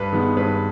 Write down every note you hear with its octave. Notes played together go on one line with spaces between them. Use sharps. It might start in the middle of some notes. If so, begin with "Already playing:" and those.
Already playing: G2 B4
D#3 G#3 B3
G2 B4